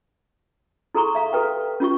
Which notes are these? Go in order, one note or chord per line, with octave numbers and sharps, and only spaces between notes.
E4 G#4 A4 A#5 C6 C#6
E5 F5 A#5
G4 A4 B4 G5
C#4 F4 G4 C#6